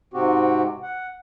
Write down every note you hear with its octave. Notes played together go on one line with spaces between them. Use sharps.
G#2 C3 C4 F#4 G4
F#5